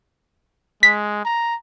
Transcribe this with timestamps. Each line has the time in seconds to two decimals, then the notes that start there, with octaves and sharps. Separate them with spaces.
0.83 G#3 B6
1.25 A#5